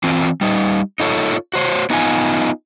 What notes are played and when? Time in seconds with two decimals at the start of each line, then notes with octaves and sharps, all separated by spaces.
0.04 E3 C4 F4
0.41 G3 D#4
1.00 D#4 F4 A4 C#5
1.54 F#4 C5 C#5
1.90 B3 D#4 F4 G#5